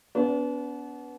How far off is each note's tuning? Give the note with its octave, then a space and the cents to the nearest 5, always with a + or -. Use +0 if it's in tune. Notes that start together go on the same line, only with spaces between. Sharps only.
B3 +0 D4 -40